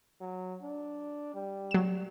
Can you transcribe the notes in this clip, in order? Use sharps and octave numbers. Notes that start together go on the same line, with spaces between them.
F#3
D4
G3
F#3 E7